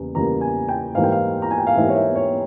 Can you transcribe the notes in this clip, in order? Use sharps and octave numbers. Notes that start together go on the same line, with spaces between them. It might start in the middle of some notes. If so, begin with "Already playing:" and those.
Already playing: E2 C#3 G3 A#3
E2 C#3 G3 A#3 A#5
G#5
G5
G#2 E3 G3 A#3 F5
G5
F5
A#5
G#5
G5
F5
G#2 E3 G3 A#3 E5
C#5
E5
C#5